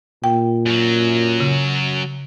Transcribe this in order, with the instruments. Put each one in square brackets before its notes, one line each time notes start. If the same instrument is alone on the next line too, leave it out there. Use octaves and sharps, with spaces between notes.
[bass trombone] A#2 [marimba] G5
[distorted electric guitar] F#2 F#3
[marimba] C#3